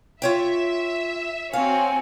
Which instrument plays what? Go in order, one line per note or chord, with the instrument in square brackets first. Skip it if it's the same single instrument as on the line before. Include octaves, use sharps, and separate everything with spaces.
[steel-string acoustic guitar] F4 C#5 G5 [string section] E5
[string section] C4 F#4 C#5 [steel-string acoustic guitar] F5 [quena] G#5